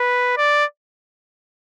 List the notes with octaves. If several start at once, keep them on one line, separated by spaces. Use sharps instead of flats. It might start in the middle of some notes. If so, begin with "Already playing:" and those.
Already playing: B4
D5